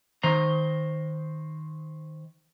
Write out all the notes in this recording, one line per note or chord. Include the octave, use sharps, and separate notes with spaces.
D#3 C5 A#5